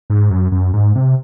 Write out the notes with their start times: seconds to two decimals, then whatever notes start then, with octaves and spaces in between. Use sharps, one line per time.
0.10 G#2
0.30 F#2
0.52 F#2
0.73 G#2
0.95 C3